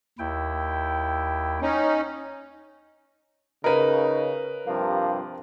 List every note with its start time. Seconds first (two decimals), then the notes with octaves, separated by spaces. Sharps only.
0.19 D#2 E4 G5
1.62 C#4 D#4
3.64 C#3 D#4 A#4 B4
4.67 G2 C3 F3 A#3